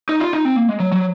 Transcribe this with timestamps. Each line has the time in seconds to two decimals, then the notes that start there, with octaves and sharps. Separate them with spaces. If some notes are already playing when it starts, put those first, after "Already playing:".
0.09 D#4
0.20 F4
0.33 D#4
0.45 C4
0.56 A#3
0.68 G#3
0.80 F#3
0.92 F#3